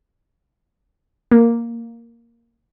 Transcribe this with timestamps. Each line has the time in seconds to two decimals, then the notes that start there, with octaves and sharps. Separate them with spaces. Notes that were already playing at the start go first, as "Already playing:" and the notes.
1.31 A#3